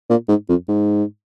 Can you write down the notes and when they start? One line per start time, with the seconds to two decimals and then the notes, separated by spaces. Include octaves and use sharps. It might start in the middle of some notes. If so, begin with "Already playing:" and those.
0.10 A#2
0.29 G#2
0.49 F2
0.68 G#2